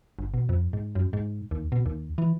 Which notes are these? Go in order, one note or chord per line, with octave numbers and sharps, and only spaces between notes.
G1
B2
F2
G#2
F#2
G#2
D#2
B2
D#2
E3